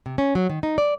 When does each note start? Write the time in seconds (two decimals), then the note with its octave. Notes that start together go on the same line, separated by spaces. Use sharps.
0.06 C3
0.18 C#4
0.35 F#3
0.50 D#3
0.63 D#4
0.78 D5